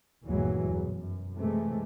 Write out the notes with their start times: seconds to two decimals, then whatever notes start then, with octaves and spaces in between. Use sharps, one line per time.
0.24 G1 D#2 A#2 E3 F#3 G#3
0.65 E2 B2
0.94 F#2
1.36 C3 E3 G#3 A3